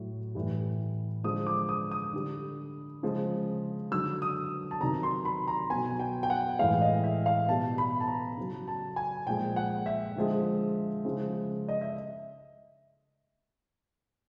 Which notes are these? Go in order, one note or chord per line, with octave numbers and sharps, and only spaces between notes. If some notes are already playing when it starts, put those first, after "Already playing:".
Already playing: A2 F#3
A2 E3 G3
D3 F3 G#3 D#6
D6
D#6
D#6
D3 G3
C#3 F3 G#3
D3 F#3 E6
D#6
A5
C3 D#3 F#3 A#5
C6
B5
A#5
B2 F#3 G#5
G5
G5
F#5
A2 E3 G#3 F5
D#5
E5
F5
B2 G3 A5
B5
A5
A#5
C#3 F#3
A5
G#5
A#2 F3 G#3 G5
F#5
E5
D3 F3 G#3
C#3 F3 G#3
D#5
E5